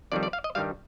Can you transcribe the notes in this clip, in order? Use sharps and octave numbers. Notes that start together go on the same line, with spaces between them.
F2 D#3 G3 D5
D5
F5
D#5
G2 D#3 G3 F5